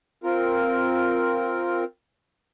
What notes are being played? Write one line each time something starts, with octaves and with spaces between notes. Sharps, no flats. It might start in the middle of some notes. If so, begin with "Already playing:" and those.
C4 F4 A#4